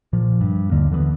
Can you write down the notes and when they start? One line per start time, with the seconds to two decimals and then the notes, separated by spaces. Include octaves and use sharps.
0.13 A#2 F3
0.41 G2
0.71 D#2 D3 A#3
0.91 D3 E3 G3 B3